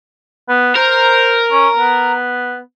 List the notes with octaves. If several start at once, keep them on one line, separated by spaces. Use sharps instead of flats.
B3
A#4 C5
C#4
B3